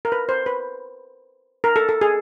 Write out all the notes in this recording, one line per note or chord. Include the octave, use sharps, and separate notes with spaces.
A#4
B4
C5
B4
A#4
A4
A4
G#4